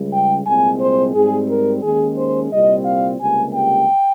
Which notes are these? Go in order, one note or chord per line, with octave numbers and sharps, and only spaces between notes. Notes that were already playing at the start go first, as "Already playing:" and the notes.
Already playing: C#2 C#3 G3
G5
C2 A#2 G#3 C4 G#5
C5
G#2 G3 C4 G#4
A#4
D#2 D#3 G#3 C#4 G#4
C5
C2 A#2 G3 C4 D#5
F5
C#2 C3 G3 A#3 G#5
G5